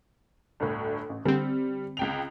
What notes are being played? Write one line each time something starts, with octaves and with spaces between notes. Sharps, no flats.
G1 D2 A2
A1
D3 G3 C4
C#2 G5 F7